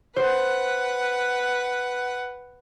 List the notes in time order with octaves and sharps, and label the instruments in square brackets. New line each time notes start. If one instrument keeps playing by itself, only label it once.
[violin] B4 F#5 [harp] C5